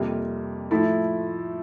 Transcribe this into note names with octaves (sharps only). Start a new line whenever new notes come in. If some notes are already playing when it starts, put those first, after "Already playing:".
Already playing: F2 C3 G3 A#3
A2 F3 A3 E4 A4